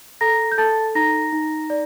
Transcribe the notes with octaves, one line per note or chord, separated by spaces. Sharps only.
A4 A#5 A#6
G6
A4 A5 A6
D#4 A#5 A#6
D#4
D5